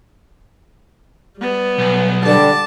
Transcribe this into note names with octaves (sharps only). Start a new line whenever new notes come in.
G3 B3
B1
D3 G3 A5 D6